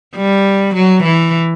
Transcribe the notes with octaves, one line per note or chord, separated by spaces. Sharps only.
G3
F#3
E3